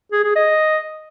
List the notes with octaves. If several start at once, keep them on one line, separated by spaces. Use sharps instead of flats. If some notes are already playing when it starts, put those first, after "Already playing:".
G#4
G#4
D#5